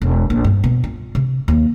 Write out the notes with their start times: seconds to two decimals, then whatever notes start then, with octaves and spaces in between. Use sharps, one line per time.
0.02 E1
0.30 A#1
0.44 G2
0.64 B2
0.84 F4
1.15 C3
1.48 D#2